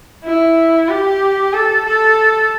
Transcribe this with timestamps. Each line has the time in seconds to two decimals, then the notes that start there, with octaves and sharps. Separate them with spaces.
0.25 E4
0.89 G4
1.53 A4
1.86 A4